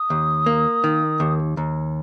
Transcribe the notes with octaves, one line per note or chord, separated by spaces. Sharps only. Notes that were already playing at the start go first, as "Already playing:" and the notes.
Already playing: D#6
D#2
A#3
D#3
D#2
D#2